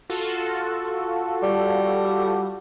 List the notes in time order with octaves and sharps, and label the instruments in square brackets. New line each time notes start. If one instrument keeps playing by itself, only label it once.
[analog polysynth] F4 F#4 A4
[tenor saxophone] G3